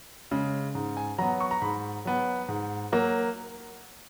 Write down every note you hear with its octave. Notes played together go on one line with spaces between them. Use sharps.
C#3 G#3
G#2
G#5
F#3 B3 A#5
C#6
A#5
G#2 B5
F#3 B3
G#2
F#3 A#3